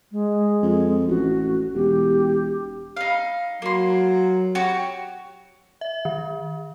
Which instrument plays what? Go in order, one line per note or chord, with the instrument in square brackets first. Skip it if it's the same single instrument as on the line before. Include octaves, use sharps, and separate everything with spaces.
[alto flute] G#3
[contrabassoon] F2
[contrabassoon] A1 [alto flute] F#4
[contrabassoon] E1 [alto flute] G4
[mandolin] D#4 F5
[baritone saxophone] F#3 [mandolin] A#3 C6
[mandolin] F#4 G4 C#5
[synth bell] E5
D#3